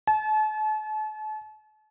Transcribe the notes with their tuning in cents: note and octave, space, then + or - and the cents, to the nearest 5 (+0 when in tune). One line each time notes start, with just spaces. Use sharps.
A5 -40